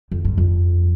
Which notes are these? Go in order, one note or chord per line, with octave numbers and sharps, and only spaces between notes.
F2
G2
F2